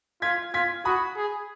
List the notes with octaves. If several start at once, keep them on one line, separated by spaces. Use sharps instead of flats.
F4 G#6 B6
F4 G#6 B6
F#4 B5 D#6
G#4